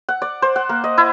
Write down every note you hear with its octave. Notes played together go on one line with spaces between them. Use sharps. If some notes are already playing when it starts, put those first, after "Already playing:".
F#5
D5
C5
F#5
A#3
D#5
E4